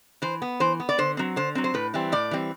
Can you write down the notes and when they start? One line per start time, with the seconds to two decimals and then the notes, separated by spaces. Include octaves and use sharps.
0.22 E3 C5
0.42 B3
0.60 E3 C5
0.80 B3
0.89 D5
0.98 D3 C5
1.17 F#3 C4
1.36 D3 C5
1.55 F#3 C4
1.64 C5
1.74 A2 B4
1.94 E3 G3 C4
2.12 A2 D5
2.31 E3 G3 C4